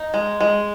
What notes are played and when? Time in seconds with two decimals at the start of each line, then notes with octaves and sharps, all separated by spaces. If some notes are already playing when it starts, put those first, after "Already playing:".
Already playing: D#4
0.14 G#3
0.40 G#3